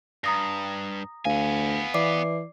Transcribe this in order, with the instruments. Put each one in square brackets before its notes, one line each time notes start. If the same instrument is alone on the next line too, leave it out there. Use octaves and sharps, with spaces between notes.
[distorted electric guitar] G2 [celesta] A#5 D#6 A#6
[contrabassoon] D2 [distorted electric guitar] B3 G#5 [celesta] F5
[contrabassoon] E3 [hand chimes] D5 D6 C7